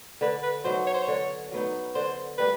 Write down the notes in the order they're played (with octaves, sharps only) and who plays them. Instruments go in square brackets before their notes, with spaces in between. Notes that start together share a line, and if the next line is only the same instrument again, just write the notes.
[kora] D3 [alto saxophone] B4
[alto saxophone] B4
[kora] F#3 B3 D#4 [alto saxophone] C5
[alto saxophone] C#5
C5
C#5
[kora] D3
F#3 B3 D#4
[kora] D3 [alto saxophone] C5
[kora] G3 A#3 [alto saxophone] B4